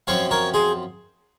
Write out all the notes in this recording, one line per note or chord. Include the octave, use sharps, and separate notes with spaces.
F#2 F3 C4 C#5 F5
A#4 C#5
G#4 C5